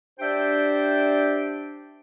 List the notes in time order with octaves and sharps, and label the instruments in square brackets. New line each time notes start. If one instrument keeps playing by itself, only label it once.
[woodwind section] D4 G4 C5 D5 E5 G5